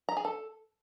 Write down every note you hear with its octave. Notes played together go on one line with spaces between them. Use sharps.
A#5
G#4
A4